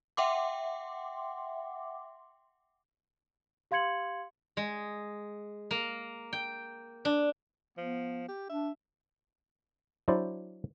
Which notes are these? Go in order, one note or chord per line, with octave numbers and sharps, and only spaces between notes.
E5 F#5 G5 C6 D6
G4 F5 C6 G#6 C#7 F#7
G#3
A#3
G5
D4
F3 B3
G4
D4 E5
F#3 D4 E4 C5 D5